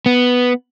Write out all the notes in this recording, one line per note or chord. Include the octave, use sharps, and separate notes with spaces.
B3